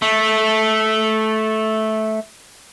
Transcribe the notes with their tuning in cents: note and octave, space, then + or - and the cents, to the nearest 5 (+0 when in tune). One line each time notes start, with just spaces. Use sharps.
A3 -10